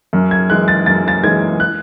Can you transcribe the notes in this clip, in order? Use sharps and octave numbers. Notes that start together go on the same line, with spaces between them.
F#2
G#6
E3 G#3 F#6
A6
F#2 A6
A6
E3 G#3 G#6
F#6